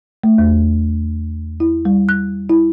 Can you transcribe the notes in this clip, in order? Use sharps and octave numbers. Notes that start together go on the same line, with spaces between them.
A3
E2
E4
G3
F#6
E4